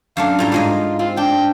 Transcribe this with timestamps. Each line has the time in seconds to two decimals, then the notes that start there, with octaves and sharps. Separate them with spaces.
0.17 F#2 A3 D4 F5
0.39 A2 G3 F4 A#5
0.52 G#2 G#3 F4 D#5
0.99 C4 F4
1.17 D4 G5